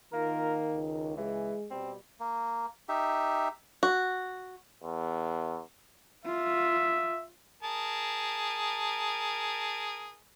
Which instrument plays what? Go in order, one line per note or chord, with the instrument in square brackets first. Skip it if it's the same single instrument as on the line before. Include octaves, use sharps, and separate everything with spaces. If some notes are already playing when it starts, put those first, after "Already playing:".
[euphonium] D#3 [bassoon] A#3 [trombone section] F4 A#4
[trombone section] C#2
[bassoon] E3 [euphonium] G#3
[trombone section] B2 G3 [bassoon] C4
[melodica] A#3
D#4 G4 E5
[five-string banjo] F#4
[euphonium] E2
[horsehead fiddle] F4 [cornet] E5
[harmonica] G#4 A#4 A5